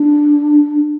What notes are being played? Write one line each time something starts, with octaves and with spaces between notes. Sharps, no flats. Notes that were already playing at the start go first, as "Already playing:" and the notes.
Already playing: D4